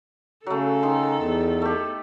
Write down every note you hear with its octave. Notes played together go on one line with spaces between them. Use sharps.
C#3 F#3 A3 A4
D#3 C6
E2
A3 G4